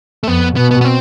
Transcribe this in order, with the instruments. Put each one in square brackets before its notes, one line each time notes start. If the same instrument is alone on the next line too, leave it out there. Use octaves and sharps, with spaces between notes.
[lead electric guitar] A3
[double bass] F2 [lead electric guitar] B3
[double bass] B2 [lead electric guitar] B3
[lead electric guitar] B3
B3
C4